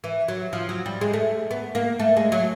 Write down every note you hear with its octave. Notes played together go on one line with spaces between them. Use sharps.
E3
F#3
F3
F#3
G3
G#3
A3
B3
A#3
A3
G#3
F#3